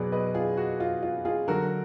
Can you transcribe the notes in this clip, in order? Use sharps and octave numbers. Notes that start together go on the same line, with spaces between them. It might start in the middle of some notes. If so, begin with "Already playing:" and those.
Already playing: B2 F#3 G#4 B4 D5
B4 D#5
F4 G#4
F#4
F4
F4
F4 G#4
D3 F#3 F#4 A#4